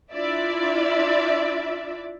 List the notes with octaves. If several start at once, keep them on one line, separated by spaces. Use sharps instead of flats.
D4 E4 F4 D5 E5